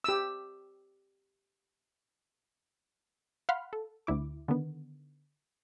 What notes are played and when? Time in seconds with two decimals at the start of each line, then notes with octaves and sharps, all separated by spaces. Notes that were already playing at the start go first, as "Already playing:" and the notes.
0.04 G4 E6
3.49 F5 F#5 B5 C6 F6
3.73 A4
4.07 D2 D3 E4 D6
4.48 D3 D#3 B3